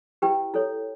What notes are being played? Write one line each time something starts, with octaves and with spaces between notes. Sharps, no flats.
E4 G4 B4 G5
E4 A4 C#5